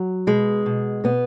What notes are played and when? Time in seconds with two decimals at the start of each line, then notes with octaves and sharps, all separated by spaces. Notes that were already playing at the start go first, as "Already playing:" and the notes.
Already playing: F#3
0.27 B2 G#3
0.66 B2
1.04 B2 B3